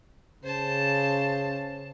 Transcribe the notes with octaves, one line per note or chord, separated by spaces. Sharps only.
C#3 C5 A5